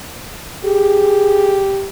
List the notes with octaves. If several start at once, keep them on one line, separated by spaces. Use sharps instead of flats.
G4 G#4